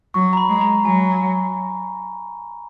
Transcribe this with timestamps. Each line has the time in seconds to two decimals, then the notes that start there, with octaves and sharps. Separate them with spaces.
0.14 F#3 C#6
0.33 A#5
0.37 B5
0.49 G#3
0.61 A#5
0.84 F#3 G#5